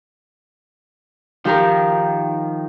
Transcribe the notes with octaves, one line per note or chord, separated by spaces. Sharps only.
D#3 F3 G4 A#4